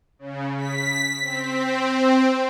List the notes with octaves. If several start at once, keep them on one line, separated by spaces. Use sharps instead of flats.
C#3
B6
C4